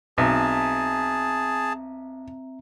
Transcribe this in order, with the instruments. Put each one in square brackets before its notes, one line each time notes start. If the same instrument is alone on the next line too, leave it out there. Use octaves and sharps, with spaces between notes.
[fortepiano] B1 [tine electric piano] C4 E5 A#5 [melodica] G#4 A5